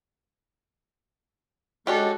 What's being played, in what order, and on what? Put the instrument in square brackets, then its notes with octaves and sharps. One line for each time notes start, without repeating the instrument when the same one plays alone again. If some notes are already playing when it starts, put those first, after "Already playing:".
[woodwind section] G#3 [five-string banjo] C#4 D4 G4 [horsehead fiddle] F#4 A4